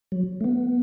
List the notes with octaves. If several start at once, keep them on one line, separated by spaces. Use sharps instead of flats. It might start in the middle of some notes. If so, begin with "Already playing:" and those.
F#3
A3
B3